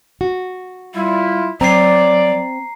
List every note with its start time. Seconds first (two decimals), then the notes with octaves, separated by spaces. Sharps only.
0.21 F#4
0.94 G3 E4 F4
1.61 F#3 C4 D5 A#5 C7